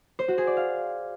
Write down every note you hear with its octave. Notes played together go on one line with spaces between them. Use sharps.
C5
F#4
G#4
D5
F5